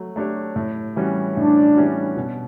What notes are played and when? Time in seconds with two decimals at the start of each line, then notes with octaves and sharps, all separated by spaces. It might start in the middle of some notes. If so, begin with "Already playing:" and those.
Already playing: F#3 A3
0.16 A3 D4 G4 C#5
0.56 A2
0.96 E3 G3 C#4 F#4
1.36 A2 D4
1.76 E3 G3 C#4 F#4
2.17 B2